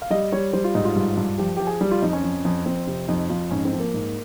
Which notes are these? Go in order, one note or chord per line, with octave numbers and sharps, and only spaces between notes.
F5
G3 D#5
G3 C#5
G3 C5
F4
G#2 D#4
F4
G2
G2
F3 G4
F3 G4
G#4
G3
F4
F2 D#4
C#4
F2
F2
F2 C4
C3
F2 D#4
F2 F4
G#2 C#4
C4
F3
A#3
G#2